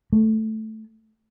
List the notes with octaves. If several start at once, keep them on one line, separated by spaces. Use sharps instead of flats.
A3